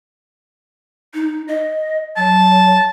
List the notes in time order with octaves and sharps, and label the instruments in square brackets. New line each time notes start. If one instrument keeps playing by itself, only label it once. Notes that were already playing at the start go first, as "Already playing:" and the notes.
[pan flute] D#4
D#5
[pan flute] F#3 [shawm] A5